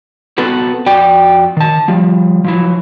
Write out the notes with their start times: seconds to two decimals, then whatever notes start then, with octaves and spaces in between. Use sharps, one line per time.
0.38 B3 C4 F#4 A4 B4
0.86 F2 F#4 D5 G5
1.57 D#3 A5
1.88 F3 G3
2.44 F3 F#3 E4